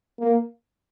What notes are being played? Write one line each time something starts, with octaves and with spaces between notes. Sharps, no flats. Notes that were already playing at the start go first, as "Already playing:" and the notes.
A#3